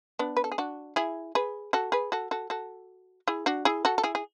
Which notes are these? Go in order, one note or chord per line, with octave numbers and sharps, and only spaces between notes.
B3 D4
B4
A4
G#4
D4 F#4
E4 G#4
G#4 B4
F#4 A4
G#4 B4
F#4 A4
F#4 A4
F#4 A4
E4 G#4
D4 F#4
E4 G#4
F#4 A4
A4
E4 G#4
G#4